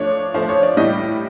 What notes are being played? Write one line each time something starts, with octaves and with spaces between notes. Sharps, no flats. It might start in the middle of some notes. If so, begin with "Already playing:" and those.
Already playing: F3 A3 D4 C#5
F3 A3 D4 C5
C#5
D5
A2 E3 G3 D#5